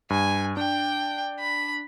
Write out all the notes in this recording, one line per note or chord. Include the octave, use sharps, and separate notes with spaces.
G2 G#5
D4 G5
B5